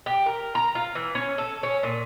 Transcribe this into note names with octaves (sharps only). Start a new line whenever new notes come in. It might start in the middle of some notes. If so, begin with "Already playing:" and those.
G4
A#4
A#5
F4
E3
C#4
A4
C#4
A#2